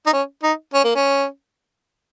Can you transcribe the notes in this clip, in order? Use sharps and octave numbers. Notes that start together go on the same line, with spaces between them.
D#4
C#4
D#4
C#4
A#3
C#4